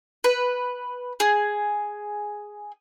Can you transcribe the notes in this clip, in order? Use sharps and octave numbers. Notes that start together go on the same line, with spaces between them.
B4
G#4